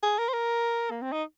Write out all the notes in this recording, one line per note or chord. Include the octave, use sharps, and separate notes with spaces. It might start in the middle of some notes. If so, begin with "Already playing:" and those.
G#4
A#4
C5
A#4
A#3
C4
D#4